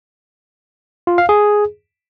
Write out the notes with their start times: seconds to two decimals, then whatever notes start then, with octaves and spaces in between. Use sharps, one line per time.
1.07 F4
1.18 F5
1.29 G#4